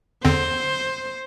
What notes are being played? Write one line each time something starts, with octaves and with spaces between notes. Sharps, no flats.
E2 D3 C4 C5